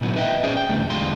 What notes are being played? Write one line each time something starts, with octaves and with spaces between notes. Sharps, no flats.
A#2 D3 D#3 F#3 B3 C4
B4 D#5 E5 G5
C#4 G#4 C5 D5
G5
B1 E2 D3 G3 A3
E2 D3 G3 G#3 F4 C6